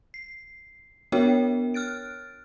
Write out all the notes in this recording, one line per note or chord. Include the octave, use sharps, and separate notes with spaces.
C7
B3 D4 F#4 A#4 C#5 G5
F6 F#6 A6 D7